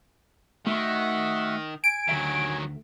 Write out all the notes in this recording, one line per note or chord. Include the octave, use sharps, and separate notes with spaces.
D#3 A3 F#4 E5 F#5 C6
G#5 D7
D2 D#3 F#3 E5